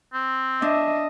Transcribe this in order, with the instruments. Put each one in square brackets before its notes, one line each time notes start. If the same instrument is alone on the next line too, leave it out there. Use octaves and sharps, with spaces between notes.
[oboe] C4
[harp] D4 [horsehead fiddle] D#5 E5